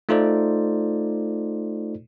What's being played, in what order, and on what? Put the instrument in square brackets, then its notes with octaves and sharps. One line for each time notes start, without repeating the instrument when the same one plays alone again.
[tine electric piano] A3 D#4 F4 A4 C5 D5